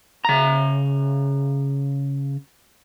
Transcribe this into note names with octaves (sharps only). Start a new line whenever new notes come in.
C#3 A#5